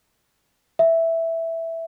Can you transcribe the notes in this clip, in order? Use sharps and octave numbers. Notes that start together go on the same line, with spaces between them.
E5